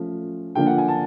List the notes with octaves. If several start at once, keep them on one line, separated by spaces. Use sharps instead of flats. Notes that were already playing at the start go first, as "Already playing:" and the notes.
Already playing: F3 A3 C#4
D3 F3 A#3 D4 G5
F#5
G#5
A5